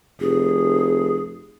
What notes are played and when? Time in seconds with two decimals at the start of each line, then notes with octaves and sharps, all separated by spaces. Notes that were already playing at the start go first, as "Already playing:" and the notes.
0.20 F1 G#4